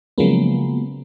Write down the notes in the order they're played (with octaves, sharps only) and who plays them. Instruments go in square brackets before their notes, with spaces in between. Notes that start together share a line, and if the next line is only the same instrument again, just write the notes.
[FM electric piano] C#3 F3 F#3 G#3 A#3 B3